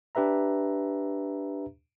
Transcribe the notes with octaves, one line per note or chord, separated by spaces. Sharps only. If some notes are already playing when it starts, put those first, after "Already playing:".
D4 G4 B4 E5 A#5